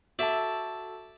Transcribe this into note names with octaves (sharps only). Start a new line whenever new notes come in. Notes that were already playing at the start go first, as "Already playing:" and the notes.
F#4 A4 D5 E5 A5